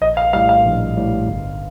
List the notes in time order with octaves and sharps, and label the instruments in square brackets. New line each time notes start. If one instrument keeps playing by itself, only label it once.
[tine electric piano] A#1 [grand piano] D#5
[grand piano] F5
[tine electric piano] A2 G3 [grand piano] F5
[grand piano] F5
[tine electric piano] A#1
A2 G3
G1